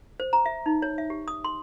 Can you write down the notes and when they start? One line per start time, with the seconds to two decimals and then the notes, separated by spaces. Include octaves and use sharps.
0.20 C5
0.33 A#5
0.46 E5
0.66 D#4
0.82 C#5
0.98 E5
1.10 G4
1.28 D#6
1.45 C6